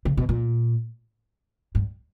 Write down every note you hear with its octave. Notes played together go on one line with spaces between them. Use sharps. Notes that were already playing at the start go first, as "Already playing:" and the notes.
C#3
B2
A#2
G2